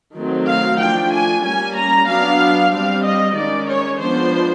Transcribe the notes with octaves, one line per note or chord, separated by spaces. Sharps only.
D#3 F#3 A3 C4
F5
F3 A3 D4 G5
G#5
G3 A#3 C#4 G#5
A#5
F#3 B3 D4 F5
G3 C4 F5
D#5
D#3 G#3 C#4 D5
C#5
F3 G#3 B3 D4 C5